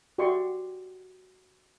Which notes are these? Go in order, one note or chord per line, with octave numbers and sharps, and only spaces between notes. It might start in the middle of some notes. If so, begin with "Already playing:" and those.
F#4 G4 D5 E5 C6 C#6